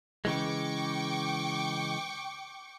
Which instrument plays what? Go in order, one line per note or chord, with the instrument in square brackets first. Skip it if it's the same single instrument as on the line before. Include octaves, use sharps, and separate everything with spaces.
[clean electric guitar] C#3 E3 G#3 [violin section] G5 C#6 D6